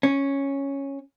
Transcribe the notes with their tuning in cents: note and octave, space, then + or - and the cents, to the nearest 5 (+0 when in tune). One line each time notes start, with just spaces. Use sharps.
C#4 -5